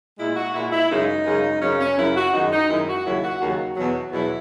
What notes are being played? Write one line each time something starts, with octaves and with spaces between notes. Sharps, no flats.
A#2 G#3 E4
F#4
A#2 G#3 E4
E4
F#2 C#3 G#3 D#4
F#2 C#3 G#3
F#2 C#3 F#3 C#4
C#4
F#2 C#3 F#3 E4
F#4
F#2 D#3 G#3 D#4
D#4
F#2 D#3 G#3 E4
F#4
D#2 C#3 F#3 E4
F#4
D#2 C#3 F#3 F#4
E2 B2 F#3
E2 B2 F#3 E4